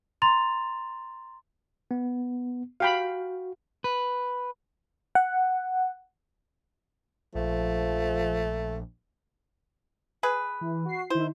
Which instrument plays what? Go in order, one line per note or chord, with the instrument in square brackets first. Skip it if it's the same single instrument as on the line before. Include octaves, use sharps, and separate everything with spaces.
[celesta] A#5 C6 A6 F7
[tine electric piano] B3
[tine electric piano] F#4 [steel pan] F5 G5 B5
[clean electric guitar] B4
[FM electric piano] F#5
[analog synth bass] A#1 [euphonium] F3 [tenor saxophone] A3
[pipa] G#4 B4
[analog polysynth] E3
F#4 C7
[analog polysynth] D#3 E4 [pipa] C5